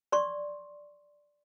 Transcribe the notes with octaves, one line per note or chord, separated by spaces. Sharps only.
D5 C6 C#6